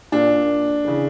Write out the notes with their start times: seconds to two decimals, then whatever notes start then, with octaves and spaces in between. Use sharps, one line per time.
0.12 A#2 D4
0.85 C#3 E3